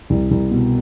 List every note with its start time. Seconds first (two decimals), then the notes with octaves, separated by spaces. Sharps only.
0.10 C2
0.31 C2
0.51 B2